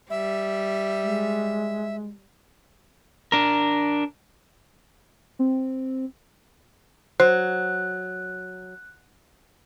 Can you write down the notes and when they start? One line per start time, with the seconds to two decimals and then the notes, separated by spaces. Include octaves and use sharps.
0.10 G3 E5
1.02 G#3
3.32 D4 A#4
5.39 C4
7.20 F#3 C5 F#6